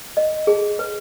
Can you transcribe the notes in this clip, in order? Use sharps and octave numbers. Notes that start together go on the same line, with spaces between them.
D#5
G#4
B4